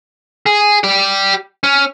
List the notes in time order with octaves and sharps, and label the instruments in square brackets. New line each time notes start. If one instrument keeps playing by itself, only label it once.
[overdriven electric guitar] G#4
G4 D5
C#4